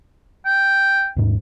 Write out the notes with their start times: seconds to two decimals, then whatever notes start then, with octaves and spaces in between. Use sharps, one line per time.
0.45 G5
1.17 D#1 G#2